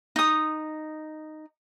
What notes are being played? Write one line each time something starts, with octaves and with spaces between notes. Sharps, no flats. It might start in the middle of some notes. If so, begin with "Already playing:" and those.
D#4 D#6